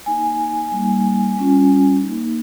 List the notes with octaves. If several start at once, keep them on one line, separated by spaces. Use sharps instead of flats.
A#3 D#4 G#5
G3 A#3 D#4
G3 C#4 F4
A#3 D#4